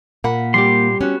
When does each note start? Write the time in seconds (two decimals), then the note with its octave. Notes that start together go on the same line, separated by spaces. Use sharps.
0.24 A#2 A#3 F#5 B5
0.54 G3 C4 G4 C6
1.01 B3 C#4 F#4